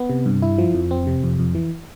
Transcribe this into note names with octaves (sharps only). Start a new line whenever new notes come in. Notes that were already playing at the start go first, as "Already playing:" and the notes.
Already playing: B3
C3
G2
E4
F3
F2
C4
C3
F2
F2
E3